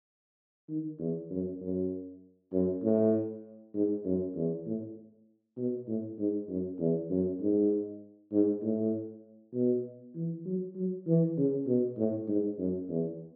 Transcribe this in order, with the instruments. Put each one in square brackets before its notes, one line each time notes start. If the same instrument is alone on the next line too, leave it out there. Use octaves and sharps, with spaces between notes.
[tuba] D#3
E2
F#2
F#2
F#2
A2
G#2
F#2
E2
A2
B2
A2
G#2
F#2
E2
F#2
G#2
G#2
A2
B2
E3
F#3
F#3
E3
C#3
B2
A2
G#2
F#2
E2